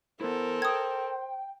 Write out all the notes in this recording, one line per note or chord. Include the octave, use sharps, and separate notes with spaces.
B3 E4 A4 A#4 C5
G5 D#6 G#6